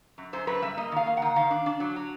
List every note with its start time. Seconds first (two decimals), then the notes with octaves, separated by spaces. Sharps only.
0.18 F#2
0.33 F#2 C5
0.47 F#2 B4
0.62 G3 E5
0.77 A#3 D#5
0.92 D#3 F5
1.06 A#3
1.17 D#3 F#5
1.36 D#3 F5
1.51 D4
1.66 D4
1.80 F#3
1.96 F#3